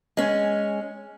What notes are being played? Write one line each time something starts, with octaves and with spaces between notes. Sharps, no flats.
G#3 C#4